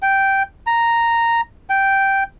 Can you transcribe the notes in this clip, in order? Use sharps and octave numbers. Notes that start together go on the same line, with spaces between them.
G5
A#5
G5